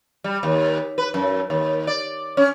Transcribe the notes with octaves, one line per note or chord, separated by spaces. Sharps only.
G3
D#2
B4
F#2
D#2
D5
C#4